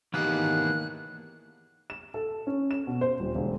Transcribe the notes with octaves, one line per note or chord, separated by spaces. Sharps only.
D#3 E3 A#3 B3 E4 G4 G#4 F#6
E7
A4
C#4
E7
B2
C5
D#1
E1